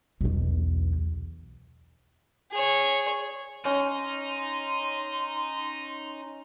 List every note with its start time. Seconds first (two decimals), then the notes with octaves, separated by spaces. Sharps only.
0.21 B1 E2
2.51 G#4 C#5
3.65 C#4 D#4 C6